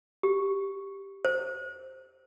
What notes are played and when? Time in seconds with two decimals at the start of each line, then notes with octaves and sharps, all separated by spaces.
0.23 G4
1.25 C5